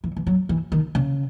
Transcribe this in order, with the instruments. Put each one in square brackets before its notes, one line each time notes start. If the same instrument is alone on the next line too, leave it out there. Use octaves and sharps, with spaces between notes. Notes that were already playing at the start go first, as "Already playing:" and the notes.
[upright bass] E3
E3
F#3
E3
D#3
C#3